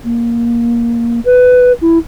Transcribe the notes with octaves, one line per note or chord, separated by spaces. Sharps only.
A#3
B4
E4